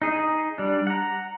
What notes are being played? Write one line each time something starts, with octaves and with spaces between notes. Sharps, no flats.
D#4 G#4
G3 D4
F#5 A#5